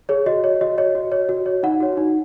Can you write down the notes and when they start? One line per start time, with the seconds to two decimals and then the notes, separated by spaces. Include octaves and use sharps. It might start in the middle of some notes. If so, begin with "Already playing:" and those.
0.09 G#4 C#5
0.26 F#4 D#5
0.44 C#5
0.61 F#4 D#5
0.78 C#5 D#5
0.95 F#4
1.12 C#5
1.29 F#4
1.46 C#5
1.63 D#4 F#5
1.80 F#4 C#5
1.97 D#4